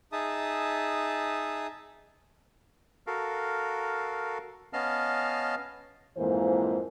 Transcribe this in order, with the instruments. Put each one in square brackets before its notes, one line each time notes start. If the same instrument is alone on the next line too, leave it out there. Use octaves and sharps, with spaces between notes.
[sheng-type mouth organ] D#4 G#4 E5 A5 D#6
[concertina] F#4 A4 A#4 F5
B3 C#4 D#5 F5 A5 F6
[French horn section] F2 G#2 E3 F3 A#3 C5